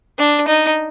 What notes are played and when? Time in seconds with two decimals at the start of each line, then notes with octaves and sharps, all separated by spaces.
0.19 D4
0.48 D#4